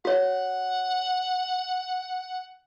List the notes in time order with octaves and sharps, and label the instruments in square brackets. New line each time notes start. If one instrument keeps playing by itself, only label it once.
[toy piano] F#4 C#5 [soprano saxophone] F#5